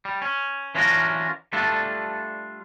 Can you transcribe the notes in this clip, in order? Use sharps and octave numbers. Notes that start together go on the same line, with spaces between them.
G3
C#4
E3 C#4 D4 F4 F#4 A#4
G3 A3 D4 F4 A4